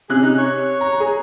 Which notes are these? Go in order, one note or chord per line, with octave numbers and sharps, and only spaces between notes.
C3 C#4 G#4 F#6
D#4
C#5
A#5
G#4